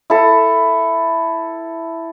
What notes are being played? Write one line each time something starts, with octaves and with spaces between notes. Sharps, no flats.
E4 A4